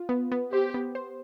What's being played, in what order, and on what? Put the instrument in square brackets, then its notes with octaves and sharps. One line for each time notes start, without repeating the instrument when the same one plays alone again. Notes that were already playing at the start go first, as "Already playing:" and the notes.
Already playing: [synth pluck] F4
B3
B3
[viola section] G4 [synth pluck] C5
[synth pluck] B3
C5